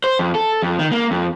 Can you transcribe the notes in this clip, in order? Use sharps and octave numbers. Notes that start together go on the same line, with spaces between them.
C5
F2
A4
F2
D#3
A#3
F2